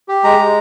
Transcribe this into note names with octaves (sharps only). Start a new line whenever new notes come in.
G4
G#3 A#5
G#3